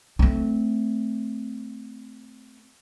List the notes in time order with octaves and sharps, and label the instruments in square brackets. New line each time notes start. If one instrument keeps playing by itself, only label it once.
[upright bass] A3 C4